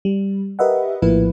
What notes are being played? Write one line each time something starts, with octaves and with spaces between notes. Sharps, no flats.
G3
G4 A#4 B4 D#5 E5 F#5
A#1 A2 F3 A#3 E4 B4